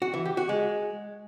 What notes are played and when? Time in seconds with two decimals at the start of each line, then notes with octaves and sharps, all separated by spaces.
0.02 F#4
0.14 E3
0.25 G4
0.37 F#4
0.49 G#3